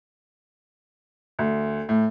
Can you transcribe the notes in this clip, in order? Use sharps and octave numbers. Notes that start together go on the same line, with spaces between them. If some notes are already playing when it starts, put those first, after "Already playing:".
D2
A2